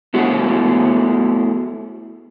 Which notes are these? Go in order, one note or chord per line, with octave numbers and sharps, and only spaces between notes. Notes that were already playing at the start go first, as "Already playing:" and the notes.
A3 B3 E4 F#4 G#4